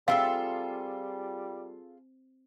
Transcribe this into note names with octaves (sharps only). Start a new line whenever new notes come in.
G3 C4 F4 G#4 A4 E5 F5